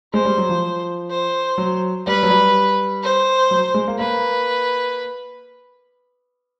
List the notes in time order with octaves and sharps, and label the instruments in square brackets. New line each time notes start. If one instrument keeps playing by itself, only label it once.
[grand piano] G#3 [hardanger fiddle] C5
[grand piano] G3
F#3
F3
[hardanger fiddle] C5
[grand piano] F#3
[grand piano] G3 [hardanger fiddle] B4
[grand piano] F#3
G3
[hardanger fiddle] C5
[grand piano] F#3
G#3
A#3
[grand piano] A#3 [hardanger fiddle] B4